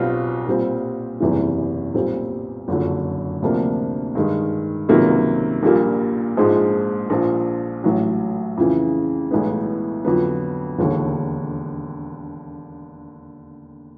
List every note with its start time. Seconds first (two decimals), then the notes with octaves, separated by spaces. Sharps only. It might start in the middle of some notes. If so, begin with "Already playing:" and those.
Already playing: B1 B2 G3 C4 F4
0.47 A#2 G3 C4
1.20 F#1 E2 C3 E3 G3
1.94 B1 A#2 G3 C4
2.68 F#1 F2 D3 F#3
3.42 D2 C3 F3 A#3 D4
4.15 G2 D#3 G#3
4.89 C#2 C3 D#3 F#3 A#3
5.63 A#1 A#2 G3 A#3
6.37 A#1 G#2 F3 G#3
7.10 A#1 A#2 F3
7.84 A1 A2 F#3
8.57 F2 C#3 E3
9.31 B1 A2 E3 G#3 B3
10.05 F2 D3 F#3 B3
10.79 E1 D#2 D3